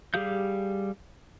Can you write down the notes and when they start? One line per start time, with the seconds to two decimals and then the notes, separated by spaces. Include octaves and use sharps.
0.14 G3 G4 G#4 F5 G6